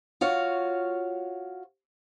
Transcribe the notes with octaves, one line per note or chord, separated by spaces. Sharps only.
F4 F#4 C#5 F5